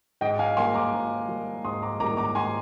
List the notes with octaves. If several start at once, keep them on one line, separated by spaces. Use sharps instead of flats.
G#2 D#5 G5
F5 G#5
G3 A#3 G#5 C6
A#5 D6
G#2
G3 A#3
G#2 C6 D#6
A#5 D6
G3 A#3 A#5 D6
A#5 D6
G#2 G#5 C6